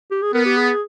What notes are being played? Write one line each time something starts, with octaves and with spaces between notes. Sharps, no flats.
G4
G#4
B3 A#4
G4
G#4